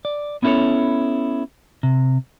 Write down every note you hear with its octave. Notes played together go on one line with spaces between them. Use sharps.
D5
B3 C#4 E4 G4 A4 C#5
C3